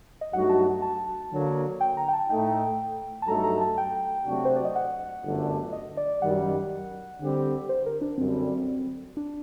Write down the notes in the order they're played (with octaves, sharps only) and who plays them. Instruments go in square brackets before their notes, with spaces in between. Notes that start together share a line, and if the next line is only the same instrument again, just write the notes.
[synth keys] D#5
[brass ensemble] G2 F#3 A3 D#4 F#4 [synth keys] F#5
[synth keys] A5
A5
[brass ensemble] D3 F#3 A#3
[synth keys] G5
A#5
G5
A5
[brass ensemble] A2 A3 D#4 [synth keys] G5
[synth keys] A5
[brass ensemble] G2 F#3 A3 D#4 A4 [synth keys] A#5
[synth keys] A#5
A5
G5
[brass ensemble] C3 F#3 A3 D4 F#4
[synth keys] C5
D5
D#5
F#5
[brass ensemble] G1 F#2 D3 A3 D4
[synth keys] D#5
D5
[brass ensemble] F#2 D#3 G3 [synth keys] F#5
[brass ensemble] D3 G3 C4 G4
[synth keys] C5
A#4
D4
[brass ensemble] F#2 D3 G3 [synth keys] C4
[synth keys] D4